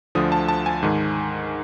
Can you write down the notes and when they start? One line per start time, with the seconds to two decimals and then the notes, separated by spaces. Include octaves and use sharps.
0.15 D2 D3 F3 D#6
0.32 A5
0.48 A5
0.66 G#5
0.83 G#2 D#3